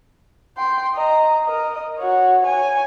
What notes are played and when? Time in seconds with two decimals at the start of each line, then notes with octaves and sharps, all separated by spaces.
0.57 G5 C6
0.95 D#5 A#5
1.46 A#4 D#5
1.98 F#4 C#5
2.43 C#5 G#5